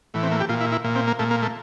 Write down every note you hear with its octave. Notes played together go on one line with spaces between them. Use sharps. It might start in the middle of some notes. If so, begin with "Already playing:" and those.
A2 E3
C4
A#3
G4
A#2 F4
E4
E4
A#2
C4
A#3
A#2 A3
A#3
A3